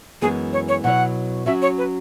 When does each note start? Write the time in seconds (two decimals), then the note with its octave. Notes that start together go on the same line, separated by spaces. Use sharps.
0.22 F#2 E3 G#3 B3 G#4
0.53 C#5
0.69 C#5
0.84 B2 F#3 E4 C#5 F#5
1.46 F#3 C#4 F#4 E5
1.62 C#5
1.78 B4